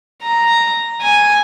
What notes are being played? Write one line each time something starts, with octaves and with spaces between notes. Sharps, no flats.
A#5
G#5